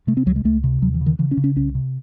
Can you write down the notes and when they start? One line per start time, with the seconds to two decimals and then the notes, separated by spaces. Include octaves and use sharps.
0.07 C3 A3
0.17 C4
0.26 C#2 F#3
0.36 G#3
0.44 C#2 A3
0.64 C3
0.82 D#2 F#3
0.94 E3
1.01 C#3
1.06 D#3
1.19 C#3 E3
1.31 C#4
1.37 C#3
1.44 C#4
1.56 C2 C#4
1.75 C3